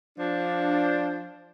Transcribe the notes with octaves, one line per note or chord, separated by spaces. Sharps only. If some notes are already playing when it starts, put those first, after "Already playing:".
F3 D4